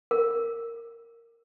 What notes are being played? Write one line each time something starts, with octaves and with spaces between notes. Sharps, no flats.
A#4